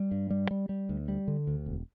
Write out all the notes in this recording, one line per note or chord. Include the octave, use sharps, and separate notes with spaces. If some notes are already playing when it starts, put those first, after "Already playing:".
Already playing: G3
G2
G3
G3
G3
D2
G3
D3
D2
E1